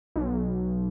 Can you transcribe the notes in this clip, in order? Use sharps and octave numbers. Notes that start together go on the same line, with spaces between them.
B1